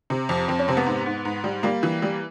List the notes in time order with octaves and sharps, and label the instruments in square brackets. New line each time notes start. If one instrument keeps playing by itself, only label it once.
[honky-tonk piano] C3
F2
F2 C4
C#4
C3 C4
B3
G#2
G#2
G#2
G3
G3 A#3
E3
G3